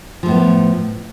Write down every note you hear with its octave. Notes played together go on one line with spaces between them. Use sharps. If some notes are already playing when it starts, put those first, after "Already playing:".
A2 F3 A3 B3